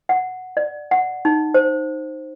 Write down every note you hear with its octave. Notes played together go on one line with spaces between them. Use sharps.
F#5
D5
F#5
D#4
C5